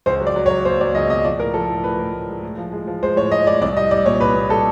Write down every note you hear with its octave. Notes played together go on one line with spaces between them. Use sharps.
C#2 C5
F#3
D5
F#3
C#5
F#3
A#3 C5
F#3 D5
C#2 D#5
B2 D#5
F3 D5
A2 A#4
F3 A4
A2
A2 B4
A2
A2
G#3
A2
F3
G#3
F3
G#3 C5
A2 C#5
G#3 D#5
A2 D5
C2 D5
G3 D#5
G3 D5
A#2 C#5
C2 B4
A#2
G3 A4